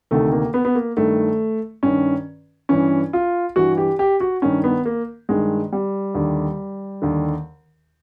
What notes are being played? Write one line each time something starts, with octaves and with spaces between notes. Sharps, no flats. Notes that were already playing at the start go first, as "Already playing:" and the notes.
D2 C3 D#3 A3
A#3
B3
B3
A#3
G2 D#3 A3
G2 D#3 C#4
G2 E3 C#4
F4
G2 E3 F#4
G4
G4
F#4
G2 D#3 C#4
B3
A#3
G2 D#3 G#3
G3
D#2 D3
D#2 D3